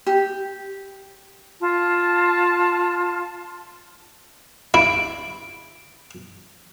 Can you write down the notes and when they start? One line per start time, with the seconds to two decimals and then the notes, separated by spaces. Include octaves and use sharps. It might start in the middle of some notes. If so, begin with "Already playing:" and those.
0.06 G4
1.61 F4 A5
4.74 E4 D7